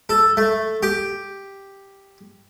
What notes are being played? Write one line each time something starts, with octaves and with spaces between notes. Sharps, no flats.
A4
A3
G4